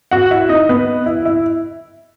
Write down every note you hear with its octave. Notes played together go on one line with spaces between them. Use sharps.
F#4 F#5
E4 E5
D#4 D#5
B3 B4
E4
E4